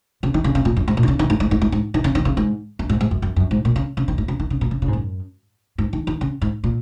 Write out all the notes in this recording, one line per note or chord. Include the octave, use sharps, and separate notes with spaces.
C#3
D#3
C#3
C#3
A#2
F#2
G#2
A#2
D#3
C#3
D#3
G#2
G#2
G#2
G#2
G#2
D#3
C#3
D#3
C#3
G#2
F#2
G#2
G#2
F#2
F#2
F#2
G#2
A#2
C#3
C#3
D#3
G#2
C#3
D#3
C#3
A#2
C#3
C#3
G#2
F#2
G#2
D#3
D#3
C#3
G#2
A#2